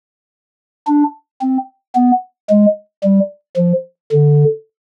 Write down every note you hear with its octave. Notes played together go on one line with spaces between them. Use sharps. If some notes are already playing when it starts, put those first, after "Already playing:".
D4
C4
B3
G#3
G3
F3
D3